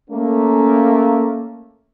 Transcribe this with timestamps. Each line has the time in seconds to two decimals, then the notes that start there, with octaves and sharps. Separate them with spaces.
0.10 A3 A#3 C#4